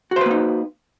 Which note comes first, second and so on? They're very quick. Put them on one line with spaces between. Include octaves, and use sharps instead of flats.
F#4 C5 B4 A#3 D#4